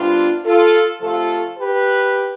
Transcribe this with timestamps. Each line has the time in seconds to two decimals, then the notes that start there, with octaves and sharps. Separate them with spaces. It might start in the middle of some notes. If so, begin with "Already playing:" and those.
Already playing: C3 G3 B3 D4 F4
0.44 F4 A4
1.00 C3 F3 A3 F4 A4
1.56 G4 B4